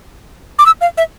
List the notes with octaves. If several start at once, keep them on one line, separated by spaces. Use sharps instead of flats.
D6
E6
F5
E5